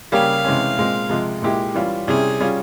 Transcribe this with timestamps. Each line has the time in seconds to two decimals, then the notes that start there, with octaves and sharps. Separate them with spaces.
0.12 C#3 G3 A#3 C#4 G4 F5
0.44 C3 E3 G#3 C#4
0.78 A#2 G#3 C4
1.09 C3 F3 G#3
1.42 A#2 G#3 E4 G4
1.74 E3 G3 C#4 F4
2.08 C3 G3 C#4 E4 G#4
2.41 G3 C#4 F4